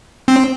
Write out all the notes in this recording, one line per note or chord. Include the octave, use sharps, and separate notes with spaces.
C4